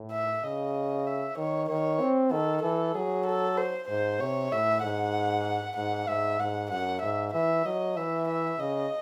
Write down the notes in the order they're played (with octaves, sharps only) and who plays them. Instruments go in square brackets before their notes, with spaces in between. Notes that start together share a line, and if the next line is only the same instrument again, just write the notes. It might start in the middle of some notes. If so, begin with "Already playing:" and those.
Already playing: [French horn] A2
[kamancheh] E5
[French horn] C#3 [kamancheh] D#5
[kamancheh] E5
[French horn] D#3 [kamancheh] C#5
[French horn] D#3 [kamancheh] C#5
[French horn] C4
[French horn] D#3 [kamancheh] A4
[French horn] E3 [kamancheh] A4
[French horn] F#3 [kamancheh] G#4
[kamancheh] A4
C5
[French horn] G#2 [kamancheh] C5
[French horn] C3 [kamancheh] C#5
[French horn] A2 [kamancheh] E5
[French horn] G#2 [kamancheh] F#5
[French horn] G#2 [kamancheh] F#5
[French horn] G#2 [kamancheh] E5
[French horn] G#2 [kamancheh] F#5
[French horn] F#2 [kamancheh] F#5
[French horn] G#2 [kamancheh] E5
[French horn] E3 [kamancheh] E5
[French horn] F#3 [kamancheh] D#5
[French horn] E3 [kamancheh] E5
[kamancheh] E5
[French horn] C#3 [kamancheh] D#5